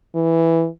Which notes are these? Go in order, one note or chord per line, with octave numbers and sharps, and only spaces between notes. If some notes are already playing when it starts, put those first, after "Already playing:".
E3